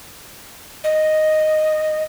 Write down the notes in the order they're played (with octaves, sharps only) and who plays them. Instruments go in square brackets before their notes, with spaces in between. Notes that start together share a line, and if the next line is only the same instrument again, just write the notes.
[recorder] D#5